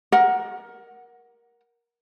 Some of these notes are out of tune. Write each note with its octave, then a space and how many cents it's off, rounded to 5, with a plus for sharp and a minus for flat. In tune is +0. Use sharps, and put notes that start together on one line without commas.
A#4 +15 F#5 +0